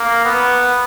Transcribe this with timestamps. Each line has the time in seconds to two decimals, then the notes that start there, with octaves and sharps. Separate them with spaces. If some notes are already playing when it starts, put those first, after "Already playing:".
Already playing: A#3
0.25 B3